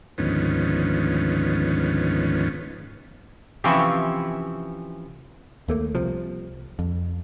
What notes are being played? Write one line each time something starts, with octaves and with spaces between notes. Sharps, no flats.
D2 G#2 D#3 F3 B3 C#4
C3 E3 F3 C4 C#4 E4
D#2 A3 A#3
C2 C3 F3
F2